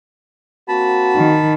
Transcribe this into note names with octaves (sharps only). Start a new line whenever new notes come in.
A#3 C4 F#4 A5 B5
D#3